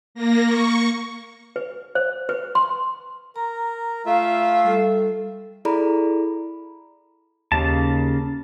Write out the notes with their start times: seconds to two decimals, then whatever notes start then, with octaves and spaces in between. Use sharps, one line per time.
0.15 A#3 A#6
0.46 C#6
1.56 B4
1.95 C5
2.29 B4
2.55 C6
3.36 A#4 A#5
4.06 A3 F4 E5 F5
4.64 G3 A4
5.65 E4 G#4 A4 D5 A#5 B5
7.52 D#2 C#3 A#3 A5